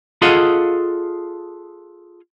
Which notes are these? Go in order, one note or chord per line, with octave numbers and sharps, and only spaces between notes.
F4 G#4 A4 D#5 F5 F#5